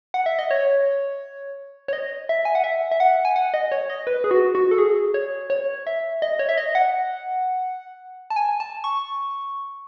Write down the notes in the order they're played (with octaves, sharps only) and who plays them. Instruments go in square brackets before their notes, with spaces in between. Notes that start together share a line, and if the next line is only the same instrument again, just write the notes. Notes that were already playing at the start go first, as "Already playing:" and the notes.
[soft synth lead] F#5
E5
D#5
C#5
C#5
D#5
E5
G#5
F#5
E5
E5
F#5
G#5
F#5
D#5
C#5
D#5
B4
G#4
F#4
F#4
A4
G#4
C#5
C#5
E5
D#5
C#5
E5
D#5
F#5
A5
G#5
A5
C#6